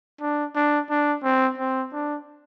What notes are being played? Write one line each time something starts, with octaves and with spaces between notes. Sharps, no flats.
D4
D4
D4
C4
C4
D4